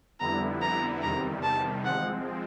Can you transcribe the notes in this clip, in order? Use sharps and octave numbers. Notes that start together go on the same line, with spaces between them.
F2 D3 G3 B3 E4 A#5
A#5
E2 C3 D#3 G3 A#5
A5
F3 G#3 C4 F#5